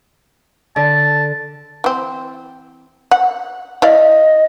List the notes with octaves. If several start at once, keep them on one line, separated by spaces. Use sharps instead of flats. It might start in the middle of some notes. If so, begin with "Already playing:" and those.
D3 A5
E3 C4
F#5
E4 D5 D#5 F5